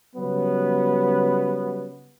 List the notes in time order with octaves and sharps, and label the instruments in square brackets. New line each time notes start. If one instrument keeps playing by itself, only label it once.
[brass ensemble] C#3 F#3 G3 B3